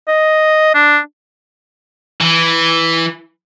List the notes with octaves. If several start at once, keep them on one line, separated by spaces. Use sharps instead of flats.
D#5
D4
E3